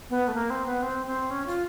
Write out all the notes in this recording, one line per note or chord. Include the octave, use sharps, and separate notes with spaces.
B3
A3
A#3
C4
B3
C4
C4
C#4
F4